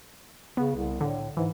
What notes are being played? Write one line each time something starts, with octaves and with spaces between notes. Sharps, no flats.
C#3 B3
C2
A2 D3
G#2 E3